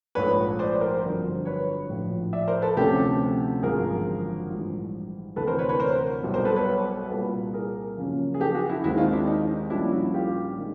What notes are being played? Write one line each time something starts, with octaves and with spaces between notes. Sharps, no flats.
A#1 G#2 F3 A3 B4 C#5
C5 D5
A#4 C5
G1 F2 D3 F#3
B4 C#5
A#1 A2 F3
D5 E5
A#4 C5
A4 B4
D2 C3 F3 A3 C#4 G4 A4
G#1 F#2 D3 F3 G#4 A#4
A#1 G#2 E3 G3
D2 C3 E3 A4 B4
A#4 C5
B4 C#5
B4 C#5
A#4 C5
B1 B2 G3
A#4 C5
A4 B4
B4 C#5
C2 A#2 G3 A#3 A4 B4
G#4 A#4
F#2 C#3 F3 A#3 C#4
G#4
G4 A4
F#4 G#4
E4 F#4
D#2 D#3 G#3 C4 E4 F#4
D#4 F4
D4 E4
D#4
A#1 A#2 G3 A#3 C#4 D4 E4
E4 F#4
F4 G4
D#3 G#3